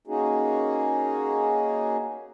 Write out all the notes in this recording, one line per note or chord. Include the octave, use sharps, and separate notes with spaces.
A#3 C#4 D#4 F#4 G#4